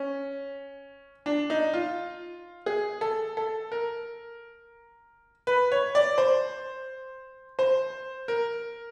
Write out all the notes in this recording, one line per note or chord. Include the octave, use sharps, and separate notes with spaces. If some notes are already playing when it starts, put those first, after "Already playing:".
Already playing: C#4
D4
D#4
F4
G#4
A4
A4
A#4
B4
C#5
D5
C5
C5
A#4